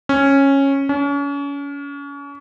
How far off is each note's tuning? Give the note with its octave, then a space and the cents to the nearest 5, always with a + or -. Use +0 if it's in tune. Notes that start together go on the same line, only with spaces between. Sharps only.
C#4 -10
C#4 +35